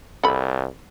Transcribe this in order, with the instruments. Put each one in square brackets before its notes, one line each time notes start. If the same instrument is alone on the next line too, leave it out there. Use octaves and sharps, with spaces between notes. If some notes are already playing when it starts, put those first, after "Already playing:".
[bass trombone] C2 [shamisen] A4 B5